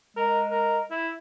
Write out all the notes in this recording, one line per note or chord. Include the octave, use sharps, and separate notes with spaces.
G#3 A#4
A#4
E4